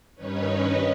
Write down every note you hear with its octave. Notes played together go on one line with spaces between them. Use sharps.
G2 D#3 C#4 D#4 B4 C#5